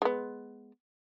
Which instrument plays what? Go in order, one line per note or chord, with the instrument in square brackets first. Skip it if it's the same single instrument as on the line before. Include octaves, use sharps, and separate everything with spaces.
[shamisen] G#3 B3